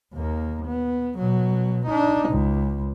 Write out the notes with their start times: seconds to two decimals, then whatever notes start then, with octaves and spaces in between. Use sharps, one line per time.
0.14 D#2 A#3
0.66 B3
1.18 B2 F#3
1.86 D4 D#4
2.29 C#2